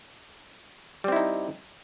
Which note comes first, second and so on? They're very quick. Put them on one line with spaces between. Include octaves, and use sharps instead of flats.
G3 C4 E4 D#4